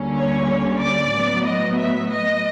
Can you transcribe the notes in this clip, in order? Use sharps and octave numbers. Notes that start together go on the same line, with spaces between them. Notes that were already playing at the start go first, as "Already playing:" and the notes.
Already playing: D2 D3 G3 A#3 C#4
C#5
D5
A2 F#3 B3
D#5
E5
D#5